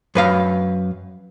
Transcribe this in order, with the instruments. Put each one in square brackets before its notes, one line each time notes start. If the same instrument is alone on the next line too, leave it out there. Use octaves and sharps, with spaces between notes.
[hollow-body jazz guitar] F#2 B4 F5